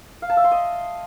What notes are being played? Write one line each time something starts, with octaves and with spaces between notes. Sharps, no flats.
F5
A5
E5
C6
D#5